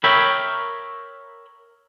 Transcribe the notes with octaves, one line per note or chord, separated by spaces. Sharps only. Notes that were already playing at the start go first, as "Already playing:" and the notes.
A#4 C#5 E5 G5 B5